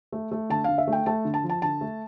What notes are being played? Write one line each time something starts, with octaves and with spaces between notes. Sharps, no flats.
A3
A3
D3 A5
D3 F5
E5
A3 G5
A3 A5
D3
A5
F3
A5
D3 A5
A3